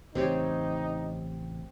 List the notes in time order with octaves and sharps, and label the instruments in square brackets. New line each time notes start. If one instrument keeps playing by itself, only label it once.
[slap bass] A1 C#3 [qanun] C4 G4 C#5 [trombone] D#4